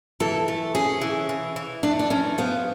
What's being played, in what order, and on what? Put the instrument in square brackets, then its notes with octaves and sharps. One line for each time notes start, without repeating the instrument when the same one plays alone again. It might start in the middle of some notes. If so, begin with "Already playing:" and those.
[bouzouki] E3 [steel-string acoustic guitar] A4
[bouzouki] A3
[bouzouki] C#4 [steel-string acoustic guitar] G#4
[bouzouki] E3
E3
E3
[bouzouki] A3 [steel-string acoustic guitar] D4
[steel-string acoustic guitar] D4
[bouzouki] E3 [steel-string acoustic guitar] C#4
[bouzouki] F3 [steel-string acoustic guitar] B3